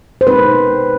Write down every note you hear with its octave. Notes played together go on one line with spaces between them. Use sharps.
C5
B2 G#3 C4 D#4 B4